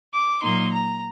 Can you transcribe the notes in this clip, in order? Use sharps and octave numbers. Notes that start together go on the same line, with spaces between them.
D6
A#2 F#3 A#3 D#4 C6
A#5